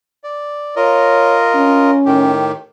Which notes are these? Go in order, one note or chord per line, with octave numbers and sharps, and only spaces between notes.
D5
F4 A#4 C#5 D#5
C#4
A2 D#3 G4